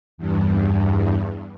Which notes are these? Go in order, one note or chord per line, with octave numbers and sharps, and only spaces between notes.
E2 G2